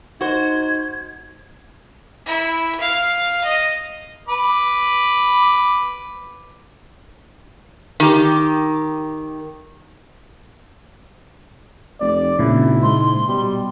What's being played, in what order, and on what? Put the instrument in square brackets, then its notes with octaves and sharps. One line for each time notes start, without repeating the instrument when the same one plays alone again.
[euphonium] D#4 [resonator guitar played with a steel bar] F#4 C5 [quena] G#6
[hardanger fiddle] E4
F5
D#5
[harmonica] B4 B5 D6
[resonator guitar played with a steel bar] D#3 G4
[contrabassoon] F1 [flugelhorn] D5
[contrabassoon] G#1 [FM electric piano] A#2 C#3 [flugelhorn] E4
[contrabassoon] G#2 [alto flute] C6
[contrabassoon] B2 [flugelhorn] G3